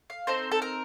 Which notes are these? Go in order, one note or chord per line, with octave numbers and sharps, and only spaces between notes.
F5
C4 D#4 A4 C5
A4
A#4